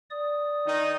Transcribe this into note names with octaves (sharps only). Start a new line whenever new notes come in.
D5 D#6
D#3 D#4